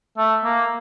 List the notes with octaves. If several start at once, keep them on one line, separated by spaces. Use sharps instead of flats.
A3
A#3